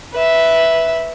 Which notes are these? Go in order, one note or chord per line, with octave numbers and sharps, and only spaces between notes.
B4 E5